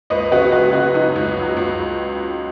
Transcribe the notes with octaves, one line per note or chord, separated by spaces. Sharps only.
C#2 B4 D#5
C#3 F#4 B4
F#3 F#4
C#3 F#4
F#3 D#4
C#2
F#3
C#2